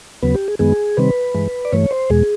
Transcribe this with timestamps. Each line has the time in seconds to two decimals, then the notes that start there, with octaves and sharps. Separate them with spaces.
0.22 D#2 C#3 F#3 B3 B4
0.35 G4
0.48 G#4
0.59 F#2 D#3 G#3 B3 G#4
0.97 C3 D#3 G3 C4 B4
1.34 G2 E3 G#3
1.65 D5
1.73 G2 E3 A3 C#5
1.91 C5
2.10 E2 B2 G#3 G#4